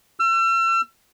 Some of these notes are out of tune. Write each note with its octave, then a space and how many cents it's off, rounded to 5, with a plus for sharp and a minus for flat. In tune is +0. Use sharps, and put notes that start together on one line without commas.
E6 +40